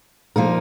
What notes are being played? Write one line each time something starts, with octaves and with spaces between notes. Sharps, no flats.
F3 A#3 D#4 A#4